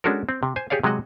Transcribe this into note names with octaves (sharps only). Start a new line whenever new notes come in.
G#3 C#4 D4 F#4 A4 A#4
C4
C3
C5 G#5
G4 G#4 C#5 D5 F5
C3 F#3 G#3 F#4 D#5 F#5